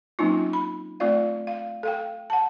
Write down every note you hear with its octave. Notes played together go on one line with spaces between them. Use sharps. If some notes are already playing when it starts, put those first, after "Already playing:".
F#3 A#3 C4 C#4 D#4 F4
B5
A3 C4 F4 D5 F5
F5
A4 F5 G5
F#5 A5